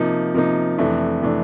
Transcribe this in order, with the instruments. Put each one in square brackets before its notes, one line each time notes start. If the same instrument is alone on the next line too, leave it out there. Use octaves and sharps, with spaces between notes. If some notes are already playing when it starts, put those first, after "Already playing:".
Already playing: [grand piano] C3 F3 A#3 D#4
C3 F3 A#3 D#4
F2 C3 E3 A3 D4
C3 E3 A3 D4